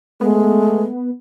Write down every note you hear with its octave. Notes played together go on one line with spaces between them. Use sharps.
G#3 A3 B3